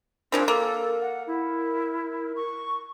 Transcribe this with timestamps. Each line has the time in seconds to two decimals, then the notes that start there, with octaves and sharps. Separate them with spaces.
0.32 C#3 F3 C4 D4 A#4
0.48 A#3 A4
1.01 F#5
1.27 E4
2.36 C#6